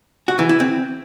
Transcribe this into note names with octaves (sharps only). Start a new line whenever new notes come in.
F#4
E3
E4
C4